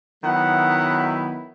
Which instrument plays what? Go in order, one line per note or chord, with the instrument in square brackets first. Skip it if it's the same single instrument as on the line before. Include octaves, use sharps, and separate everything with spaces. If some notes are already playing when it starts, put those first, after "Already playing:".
[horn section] D#3 F#3 B3 E4 F#5